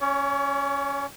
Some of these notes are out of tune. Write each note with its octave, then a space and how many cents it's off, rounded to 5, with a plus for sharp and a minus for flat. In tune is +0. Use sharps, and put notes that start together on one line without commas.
C#4 +0 C#5 +40